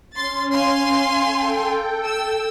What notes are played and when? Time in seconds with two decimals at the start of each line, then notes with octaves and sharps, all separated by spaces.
0.15 C#4 C6 A6
0.53 F5 G#5 C6
1.25 A4 G5
2.05 E6